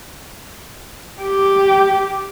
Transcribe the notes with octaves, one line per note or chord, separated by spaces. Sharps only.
G4